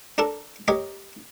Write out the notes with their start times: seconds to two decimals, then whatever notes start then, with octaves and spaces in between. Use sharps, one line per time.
0.18 D4 A4 A#4 A5
0.68 G4 A#4 C#5 D#5